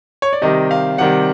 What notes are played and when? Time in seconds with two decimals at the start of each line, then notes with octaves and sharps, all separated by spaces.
0.22 C#5
0.33 D5
0.42 C3 D#3 G3 D#5
0.71 F5
0.98 C3 D#3 G3 F#5